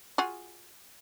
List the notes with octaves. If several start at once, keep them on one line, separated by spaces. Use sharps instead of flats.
F4 F#4 G#4